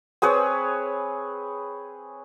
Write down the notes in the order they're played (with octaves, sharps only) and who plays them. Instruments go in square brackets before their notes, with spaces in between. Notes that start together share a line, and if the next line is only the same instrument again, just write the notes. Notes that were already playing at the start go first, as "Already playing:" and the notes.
[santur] C4 G#4 B4 C#5